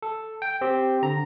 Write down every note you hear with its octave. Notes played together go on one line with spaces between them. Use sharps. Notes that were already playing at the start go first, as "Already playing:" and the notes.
A4
G5
C4 G4
D3 A#5